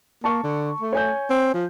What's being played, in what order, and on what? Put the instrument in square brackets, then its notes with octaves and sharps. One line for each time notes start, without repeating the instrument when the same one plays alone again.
[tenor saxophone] A#3 [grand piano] A5 C#6
[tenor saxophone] D3
A3
[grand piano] C#5 G#5 G6
[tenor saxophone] C4
F3